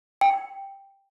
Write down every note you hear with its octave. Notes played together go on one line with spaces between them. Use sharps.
G5